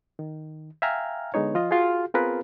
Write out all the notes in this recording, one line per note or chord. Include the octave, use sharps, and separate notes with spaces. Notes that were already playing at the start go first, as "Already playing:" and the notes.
D#3
E5 F5 G5 G#5 A#5 F6
D3 G#3 B3 D#4 C#5
F3 F4 D#5
F4 F#4 G#4
B3 C4 F4 G#4 A#4 B4